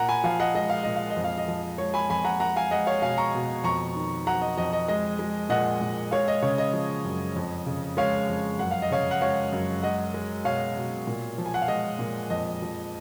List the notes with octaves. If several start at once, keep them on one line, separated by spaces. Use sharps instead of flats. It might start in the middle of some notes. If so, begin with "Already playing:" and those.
Already playing: A#2 F#5 A#5
G#5 B5
F3 F5 G#5
D#5 F#5
G#3 D#5
F5
A#2 D#5
F5
D#5
F2
F5
D#5
F3
G#3 C#5
G#5 B5
F2 G#5 B5
F#5 A#5
G#3 F#5 A#5
F5 G#5
G#3 D#5 F#5
C#5 F5
B2 F5 G#5
A#5 C#6
B2
F2 A#5 C#6
D#3
F#3 F#5 A#5
D#5
F2 D#5
D#5
G#3 D#5
G#3
A#2 D#5 F#5
A#2
G#3 C#5 F5
D#5
C#3 C#5
D#5
F3
F#2
F2
C#3
G#3 C#5 F5
F2
F#2 F#5
F5
D#5
C#3 C#5 F5
F#5
G#3 C#5 F5
F#2
G#3 D#5 F#5
G#3
B2 C#5 F5
B2
A#2
F3
G#5
F#5
F5
G#3 D#5
A#2
F2 D#5
F3